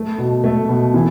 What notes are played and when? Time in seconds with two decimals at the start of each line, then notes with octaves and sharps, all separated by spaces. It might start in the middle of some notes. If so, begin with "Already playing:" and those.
Already playing: A3
0.18 B2
0.44 A3
0.69 B2
0.94 E3